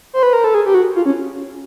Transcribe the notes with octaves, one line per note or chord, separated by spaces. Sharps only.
C5
B4
A#4
A4
G#4
G4
F#4
F4
C#4